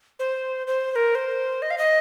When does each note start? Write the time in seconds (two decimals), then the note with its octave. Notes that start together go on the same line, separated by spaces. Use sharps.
0.19 C5
0.67 C5
0.91 C5
0.96 A#4
1.15 C5
1.62 D#5
1.71 F5
1.78 D#5